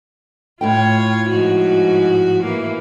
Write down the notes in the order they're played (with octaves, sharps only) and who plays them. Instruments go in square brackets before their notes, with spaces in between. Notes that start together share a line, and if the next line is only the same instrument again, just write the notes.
[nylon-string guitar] A2 E4 G5 [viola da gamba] F4 C#5
[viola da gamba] G#2 F3 F#4
E3 A#3